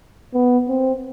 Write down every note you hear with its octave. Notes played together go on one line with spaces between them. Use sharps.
B3
C4